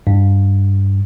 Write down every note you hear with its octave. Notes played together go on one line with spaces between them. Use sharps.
G2